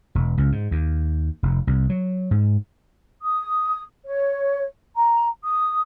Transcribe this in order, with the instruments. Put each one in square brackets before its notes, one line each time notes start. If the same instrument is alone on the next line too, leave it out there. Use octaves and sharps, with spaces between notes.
[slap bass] E1
C#2
G#2
D#2
F1
C2
F#3
G#2
[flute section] D#6
C#5
A#5
D#6